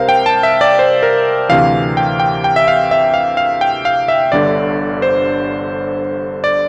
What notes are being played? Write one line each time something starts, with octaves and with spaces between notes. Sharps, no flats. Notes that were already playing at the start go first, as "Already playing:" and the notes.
Already playing: C2 C3 A#4 C5 F5
G5
A5
E5
D5
C5
A#4
D2 C3 E3 F5
G5
G5
G5
E5
F5
E5
F5
F5
G5
F5
E5
G1 G2 D3 D5
C5
D5